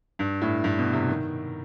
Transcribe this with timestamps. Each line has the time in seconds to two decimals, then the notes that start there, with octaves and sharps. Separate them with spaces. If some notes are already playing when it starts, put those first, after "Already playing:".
0.19 G2
0.42 A2
0.64 G2
0.79 B2
0.93 C3
1.09 D#3